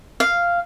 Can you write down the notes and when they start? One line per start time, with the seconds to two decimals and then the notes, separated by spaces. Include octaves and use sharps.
0.20 F5